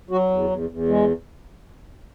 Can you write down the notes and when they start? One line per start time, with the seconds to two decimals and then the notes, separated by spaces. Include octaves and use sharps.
0.11 F#3 F#4
0.30 E2
0.50 E2
0.69 E2
0.89 G#3